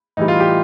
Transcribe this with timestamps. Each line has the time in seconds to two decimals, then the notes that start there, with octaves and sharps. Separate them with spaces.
0.17 A2 E3 G3 D#4
0.28 F4
0.40 G4